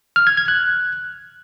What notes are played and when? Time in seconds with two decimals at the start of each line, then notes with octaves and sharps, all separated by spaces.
0.16 F6
0.27 G#6
0.37 G#6
0.48 F#6